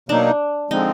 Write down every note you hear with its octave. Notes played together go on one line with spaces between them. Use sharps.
B2 F#3 A#3 D4 D#4
D3 F3 G#3 C4 D#4